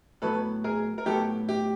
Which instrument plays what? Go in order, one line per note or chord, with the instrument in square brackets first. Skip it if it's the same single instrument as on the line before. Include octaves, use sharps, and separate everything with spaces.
[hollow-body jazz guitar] A2 F#3 B3 [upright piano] A4 B4
[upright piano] G#4 A#4
A#4
[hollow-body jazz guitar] A2 F#3 B3 [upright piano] G4 A4
[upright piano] G4